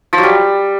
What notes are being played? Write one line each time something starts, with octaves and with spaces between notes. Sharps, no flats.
F3
F#3
G3